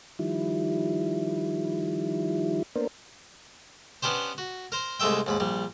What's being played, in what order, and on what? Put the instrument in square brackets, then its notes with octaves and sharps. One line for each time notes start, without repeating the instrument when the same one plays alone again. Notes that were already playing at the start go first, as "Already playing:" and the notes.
[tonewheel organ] D#3 F3 G3 E4
A#3 B3 D4 A#4 C5
[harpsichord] B3 C#4 D4 G4 C5
F#4
A#4 C5
C2 G#3 A3 E5 G5
D#2 G#2 B5
A#1 G3